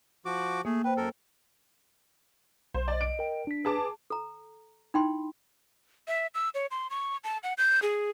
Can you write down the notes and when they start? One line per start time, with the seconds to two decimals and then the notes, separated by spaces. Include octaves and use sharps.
0.25 F3 F#4 D6
0.65 A3 A#3 G#4
0.84 B4 C5 G5
0.97 F#2 A4 A#4
2.74 B1 C5
2.88 D5 D#5
3.01 D7
3.19 A#4 G5
3.47 D4 B6
3.65 G#4 B4 A5 D6
4.10 A4 A#5
4.94 D#4 E4 G5 B5 C6
6.08 E5
6.34 E6
6.55 C#5
6.71 C6
6.90 C#6
7.24 A5
7.43 F#5
7.58 G6
7.82 G#4